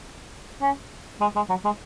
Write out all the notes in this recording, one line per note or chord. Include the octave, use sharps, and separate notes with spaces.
C#4
G#3
G#3
F#3
G#3